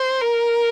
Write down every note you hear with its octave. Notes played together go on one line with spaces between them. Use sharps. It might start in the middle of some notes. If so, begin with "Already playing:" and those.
Already playing: C5
A#4